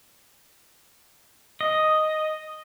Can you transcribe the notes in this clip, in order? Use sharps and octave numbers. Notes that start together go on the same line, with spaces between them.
D#5